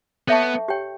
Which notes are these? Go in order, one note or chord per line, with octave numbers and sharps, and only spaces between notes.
B3 A4 C#5 E5 A5 C#6
G4 C#5 G5